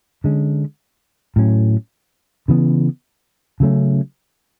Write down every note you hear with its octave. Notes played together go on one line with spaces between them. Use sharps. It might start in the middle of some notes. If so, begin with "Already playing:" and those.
D3 G#3 C#4
A2 F#3 C#4
C#3 E3 B3
C#3 F#3 A3 C#4